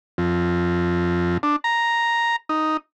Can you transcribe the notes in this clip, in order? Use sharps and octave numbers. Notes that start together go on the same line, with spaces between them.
F2
D4
A#5
D#4